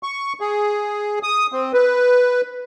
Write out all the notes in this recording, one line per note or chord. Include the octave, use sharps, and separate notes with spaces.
C#6
G#4
D#6
C4
B4